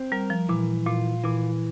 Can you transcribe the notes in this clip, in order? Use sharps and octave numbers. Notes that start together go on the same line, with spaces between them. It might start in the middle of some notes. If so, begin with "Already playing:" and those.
Already playing: C4
G3 A#4
F3
A#2 E3
A#2 F4
A#2 E3